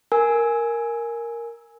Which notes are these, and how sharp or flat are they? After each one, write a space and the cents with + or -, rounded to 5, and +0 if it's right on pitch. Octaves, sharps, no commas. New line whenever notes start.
A#4 +0 G#5 +5 E6 -25